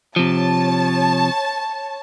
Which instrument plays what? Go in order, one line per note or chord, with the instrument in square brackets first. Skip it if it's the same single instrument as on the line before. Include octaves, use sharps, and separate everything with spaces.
[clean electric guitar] C3 F3 [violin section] C#5 A5